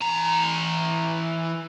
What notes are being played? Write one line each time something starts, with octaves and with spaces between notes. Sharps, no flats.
E3 A#5